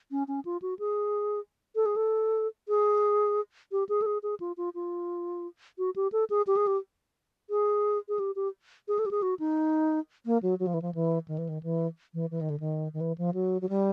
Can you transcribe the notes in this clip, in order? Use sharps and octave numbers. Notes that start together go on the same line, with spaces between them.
C#4
C#4
F4
F#4
G#4
A4
G#4
A4
G#4
G4
G#4
A4
G#4
G#4
F4
F4
F4
F#4
G4
A4
G#4
G4
G#4
G4
G#4
G#4
G4
G4
G#4
A4
G4
G#4
F#4
D#4
A#3
F#3
F#3
F3
E3
F3
E3
D#3
E3
D#3
E3
E3
E3
D#3
D3
D#3
D#3
E3
F3
F#3
F#3
G3